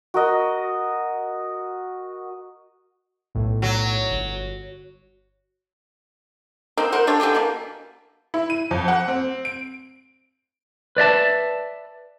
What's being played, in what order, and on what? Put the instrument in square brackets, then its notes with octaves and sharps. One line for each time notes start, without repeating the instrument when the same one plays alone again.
[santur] F#4 A#4 D#5
[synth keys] B1 A2
[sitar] F#3
[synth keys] G1
[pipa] A#3 C4 D#4
A#4 C5 F#5
D4 G4 A4 C#5
D3 E3 B3 G4
B2 A#3
[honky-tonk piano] E4
D#7
F2
F#5
C4
D7
[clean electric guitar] B4 D5 E5 A5